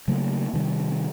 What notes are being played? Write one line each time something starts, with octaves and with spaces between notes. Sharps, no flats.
C#3 F#3 A3 A#3
C3 D#3 G3